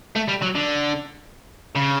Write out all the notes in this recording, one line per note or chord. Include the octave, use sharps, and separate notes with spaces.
A3
G3
F#3
D3
C#3